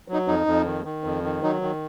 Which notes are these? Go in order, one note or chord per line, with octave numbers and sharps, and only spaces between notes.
F#3
D#4
F2 D#4
F2
D#3
D#3
F2
D#3
F#3 D#4
D#3